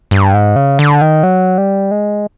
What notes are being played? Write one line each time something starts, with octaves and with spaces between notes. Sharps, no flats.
G2
G#2
C#3
D3
D#3
F#3
G3
G#3